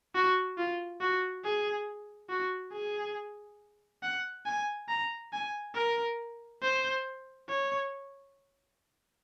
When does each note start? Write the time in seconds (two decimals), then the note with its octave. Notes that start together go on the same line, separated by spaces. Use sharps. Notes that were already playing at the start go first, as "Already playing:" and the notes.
0.15 F#4
0.57 F4
1.00 F#4
1.44 G#4
2.30 F#4
2.73 G#4
4.03 F#5
4.46 G#5
4.89 A#5
5.33 G#5
5.75 A#4
6.62 C5
7.49 C#5